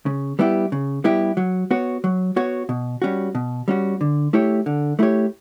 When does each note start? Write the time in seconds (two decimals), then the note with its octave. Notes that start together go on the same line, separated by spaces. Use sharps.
0.06 C#3
0.39 G3 B3 E4 G4
0.72 C#3
1.04 G3 B3 E4 G4
1.37 F#3
1.71 B3 F#4 C#5
2.04 F#3
2.36 B3 F#4 C#5
2.69 B2
3.02 G3 C#4 F#4
3.35 B2
3.68 G3 C#4 F#4
4.01 D3
4.33 A3 E4 G4 C#5
4.66 D3
4.99 A3 E4 G4 C#5